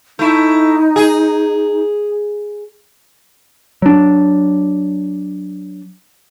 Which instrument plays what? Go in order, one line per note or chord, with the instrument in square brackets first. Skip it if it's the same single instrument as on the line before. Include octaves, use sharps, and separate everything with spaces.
[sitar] A3 E4 [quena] D#4
[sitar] G#4
[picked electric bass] F#3 D4